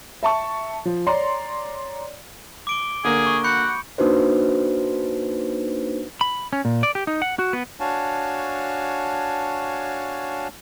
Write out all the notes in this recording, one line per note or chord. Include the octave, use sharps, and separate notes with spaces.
E5 A5 C#6
F3
C#5 D5 A#5 C6
D6 D7 G7
D3 A#3 G#4
C#6
F#4 B5 G6 C#7
A#3 D4 D#4 F#4 B4 C5
B5
C#4
A#2
D5
G4
D#4
F#5
F#4
B3
D4 F#4 C#5 F5 G#5 A5